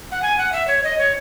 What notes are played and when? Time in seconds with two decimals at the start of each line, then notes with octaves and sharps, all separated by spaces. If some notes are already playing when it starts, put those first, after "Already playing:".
0.12 F#5
0.22 G#5
0.38 F#5
0.52 E5
0.68 C#5
0.83 D#5
0.98 C#5